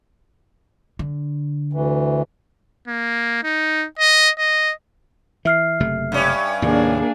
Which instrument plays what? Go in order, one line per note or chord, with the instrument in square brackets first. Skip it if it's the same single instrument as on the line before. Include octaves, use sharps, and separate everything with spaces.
[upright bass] D3
[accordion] D2 E3
[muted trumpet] A#3
D#4
D#5
D#5
[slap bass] E3 [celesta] E5 F6 C7
[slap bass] F#1 C3 A3
[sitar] G2 C#4
[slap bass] D#2 A2 C3 [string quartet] A#3 D4 G#4